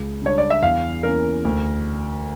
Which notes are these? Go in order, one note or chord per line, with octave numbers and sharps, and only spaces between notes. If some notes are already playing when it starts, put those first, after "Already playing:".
Already playing: C#2
C#3 G3 D4 C#5
D5
E5
E2 F5
E3 A#3 C#4 A#4
D2